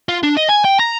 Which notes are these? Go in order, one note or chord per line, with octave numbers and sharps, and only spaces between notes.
F4
D4
D#5
G#5
G5
A#5